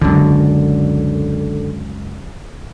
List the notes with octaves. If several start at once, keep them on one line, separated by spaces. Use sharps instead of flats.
C#2 F#2 D3